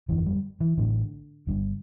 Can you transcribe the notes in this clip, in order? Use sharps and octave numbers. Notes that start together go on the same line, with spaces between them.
G1 F2 D3 E3
G3
E3
A1 A2 D3
G1 G2 D3